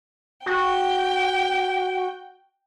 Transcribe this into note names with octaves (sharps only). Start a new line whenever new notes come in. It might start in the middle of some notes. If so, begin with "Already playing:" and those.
F#4 G5